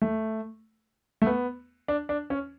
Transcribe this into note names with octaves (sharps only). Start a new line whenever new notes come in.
A3
A3
B3
D4
D4
C#4